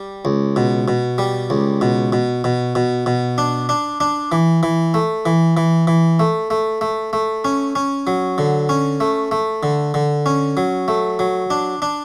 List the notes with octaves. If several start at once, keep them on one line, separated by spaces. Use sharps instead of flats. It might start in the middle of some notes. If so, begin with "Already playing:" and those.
Already playing: G3
C#2
B2
B2
G3
C#2
B2
B2
B2
B2
B2
D4
D4
D4
E3
E3
A3
E3
E3
E3
A3
A3
A3
A3
C#4
C#4
F#3
D3
C#4
A3
A3
D3
D3
C#4
F#3
A3
F#3
D4
D4